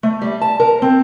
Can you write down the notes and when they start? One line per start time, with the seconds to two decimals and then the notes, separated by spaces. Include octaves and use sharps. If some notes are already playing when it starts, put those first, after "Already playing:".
0.03 A3
0.22 G3
0.41 A5
0.60 A#4
0.82 C4